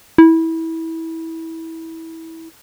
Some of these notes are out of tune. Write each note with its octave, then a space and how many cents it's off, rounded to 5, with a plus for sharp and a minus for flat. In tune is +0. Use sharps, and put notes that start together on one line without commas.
E4 -20